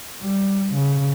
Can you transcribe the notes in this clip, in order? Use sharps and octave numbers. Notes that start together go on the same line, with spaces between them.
G3
C#3